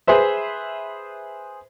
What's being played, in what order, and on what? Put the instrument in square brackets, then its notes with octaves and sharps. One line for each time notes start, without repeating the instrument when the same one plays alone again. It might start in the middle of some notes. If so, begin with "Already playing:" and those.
[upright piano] G#4 B4 C5 E5